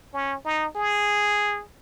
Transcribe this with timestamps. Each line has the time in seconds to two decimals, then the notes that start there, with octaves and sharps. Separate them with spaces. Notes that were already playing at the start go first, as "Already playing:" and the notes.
0.14 C#4
0.45 D#4
0.76 G#4